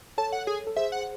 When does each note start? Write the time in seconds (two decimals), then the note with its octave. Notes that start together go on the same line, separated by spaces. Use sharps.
0.18 A4 C#5 A5
0.32 F#5
0.47 G#4
0.67 A4
0.76 G#4 C5 E5
0.92 F#5